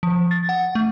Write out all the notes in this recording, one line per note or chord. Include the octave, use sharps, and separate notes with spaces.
F3
A6
F#5
A3